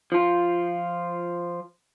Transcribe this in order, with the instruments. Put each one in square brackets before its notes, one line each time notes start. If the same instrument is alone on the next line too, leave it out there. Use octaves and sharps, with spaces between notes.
[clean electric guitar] F3 F4